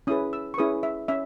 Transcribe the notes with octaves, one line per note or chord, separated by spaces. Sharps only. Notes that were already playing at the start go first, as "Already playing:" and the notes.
C#4 E4 G#4 B4 D#6
E6
C#6
C#4 E4 G#4 B4 D#6
E5
C#4 E5